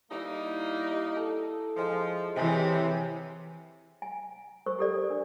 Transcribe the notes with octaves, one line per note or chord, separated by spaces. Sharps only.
G3 A#3 D#4 E4 F#5 E6
A4
F3 G#3 C5 E5
C3 E3 G4 G#4 C#5
G#5
A#4 C5 C#6 E6
G4 A4 D5
D4 A#4